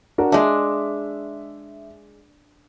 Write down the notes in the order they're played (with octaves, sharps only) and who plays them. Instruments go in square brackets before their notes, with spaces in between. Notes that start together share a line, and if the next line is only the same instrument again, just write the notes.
[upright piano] D4 F#4 A#4
[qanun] G#3 D4 [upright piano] E5